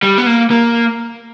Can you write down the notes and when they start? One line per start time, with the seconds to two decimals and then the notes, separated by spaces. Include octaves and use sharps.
0.03 G3
0.18 B3
0.26 A#3
0.51 A#3